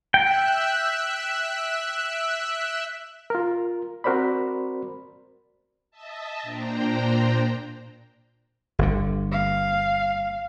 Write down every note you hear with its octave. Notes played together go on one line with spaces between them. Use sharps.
E5 G5 E6 F#6
F4 A#4
C4 F#4 A#4 C5 D5 B5
D#5 E5 A5
A#2 D4 C5 G5 A#5
G1 D3
F5